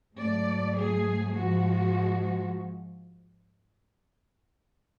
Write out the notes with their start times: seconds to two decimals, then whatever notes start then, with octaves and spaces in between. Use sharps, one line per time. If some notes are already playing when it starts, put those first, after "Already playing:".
0.16 G#2 F#3 A3 D5
0.75 G#4
1.33 G#2 F3 G#3 F#4